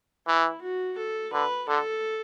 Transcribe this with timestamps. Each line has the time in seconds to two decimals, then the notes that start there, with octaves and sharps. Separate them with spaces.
0.27 E3 E4
0.62 F#4
0.98 A4
1.33 D3 B4
1.68 D3 A4